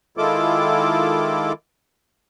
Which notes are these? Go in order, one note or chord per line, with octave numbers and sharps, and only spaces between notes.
D#3 G#3 E4 F4 A4 D6